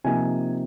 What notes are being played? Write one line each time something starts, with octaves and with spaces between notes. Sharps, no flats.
C3 F3 A#3 D#4 G#5